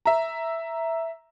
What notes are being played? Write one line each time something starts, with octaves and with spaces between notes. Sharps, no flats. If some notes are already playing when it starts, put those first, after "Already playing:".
E5 A#5